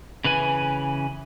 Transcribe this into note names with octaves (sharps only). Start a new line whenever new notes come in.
C#3 E3 B4 G#5